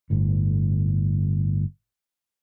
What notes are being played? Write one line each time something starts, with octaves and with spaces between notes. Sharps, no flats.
G1 A2